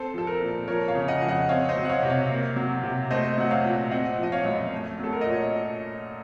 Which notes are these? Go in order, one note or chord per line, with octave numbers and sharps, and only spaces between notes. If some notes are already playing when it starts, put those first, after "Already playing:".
Already playing: C4 A4 C5
F3 A4
A#4
A#2
F3 A#4 C#5
C#5 F5
C#3
D#5 F#5
F2
D#5 F#5
C4 C#5 F5
C5 D#5
F#3
F#5
C#5 F5
C3
C#5 F5
A#3
F#3
C3
A3 C5 D#5
F#3 F#5
C#5 F5
A#2
C4 D#5 F#5
F3 D#5
C#5 F5
F#2
A3
F#3 A4
A#4
D#5
A#2 C#5